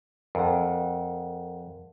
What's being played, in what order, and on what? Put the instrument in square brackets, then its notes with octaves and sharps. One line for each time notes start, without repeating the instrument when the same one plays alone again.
[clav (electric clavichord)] F2 [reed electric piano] A#4 F#5